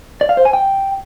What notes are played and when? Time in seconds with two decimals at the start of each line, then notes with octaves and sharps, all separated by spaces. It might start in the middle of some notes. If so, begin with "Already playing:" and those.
0.21 D5
0.29 F5
0.37 C5
0.45 G#5
0.53 G5